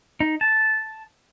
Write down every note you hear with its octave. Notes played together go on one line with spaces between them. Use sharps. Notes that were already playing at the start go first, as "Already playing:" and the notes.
D#4
A5